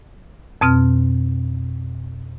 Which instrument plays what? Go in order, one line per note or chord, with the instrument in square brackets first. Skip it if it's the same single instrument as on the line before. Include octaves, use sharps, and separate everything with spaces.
[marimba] F2 B2 C4 F6